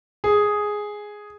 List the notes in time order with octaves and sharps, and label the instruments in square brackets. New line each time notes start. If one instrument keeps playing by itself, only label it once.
[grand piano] G#4